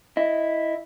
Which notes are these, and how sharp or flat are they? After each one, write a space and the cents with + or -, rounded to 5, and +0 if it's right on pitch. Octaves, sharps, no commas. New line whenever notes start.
E4 +0 D#5 +0